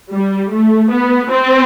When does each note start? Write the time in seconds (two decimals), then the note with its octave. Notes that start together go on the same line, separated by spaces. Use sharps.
0.13 G3
0.53 A3
0.92 B3
1.30 C4